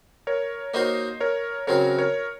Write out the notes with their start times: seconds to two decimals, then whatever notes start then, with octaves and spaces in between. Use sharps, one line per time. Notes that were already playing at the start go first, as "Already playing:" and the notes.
0.27 A#4 C#5
0.74 A#3 D#4 F#4 A#4 C5 C#5 D#5
1.20 A#4 C#5
1.67 C#3 F#3 C4 F#4 A#4 C#5
1.98 A#4 C#5